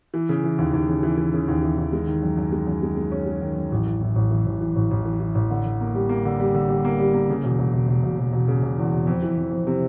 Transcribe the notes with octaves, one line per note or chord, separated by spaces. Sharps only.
E3
C#3
E3
D#2
D#2
C#3
E3
E3
C#3
D#2
E3
D#2
G#3
D#3
F#2
F#2
G#3
F#2
G#3
G#3
C#4
G#3
D#3
F#2
A1
E3
A2
A1
E3
A1
E3
A1
A1
E3
E3
A1
D3
D3
A#3
G3
A#3
D3
G3
D3
G3
A#3
G3
A#3
C#3
E1
E1
E1
E1
E1
E1
E1
C#3
E1
E2
E1
F2
E3
F2
F2
C3